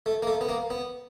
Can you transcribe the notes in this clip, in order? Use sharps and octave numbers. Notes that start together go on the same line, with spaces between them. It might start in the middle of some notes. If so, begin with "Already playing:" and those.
A3
A#3
A3
B3
A#3
B3